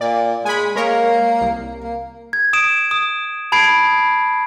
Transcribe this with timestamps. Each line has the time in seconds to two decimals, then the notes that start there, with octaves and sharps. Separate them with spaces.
0.01 A#2 D5
0.45 G#3 G#5 B5
0.75 G#3 A#3 A#4 C#5
1.41 C2
1.83 A#3
2.33 G#6
2.53 D#6 G#6 D7 E7
2.91 D#6
3.52 A5 B5 G#6 C7 D7
3.87 D#6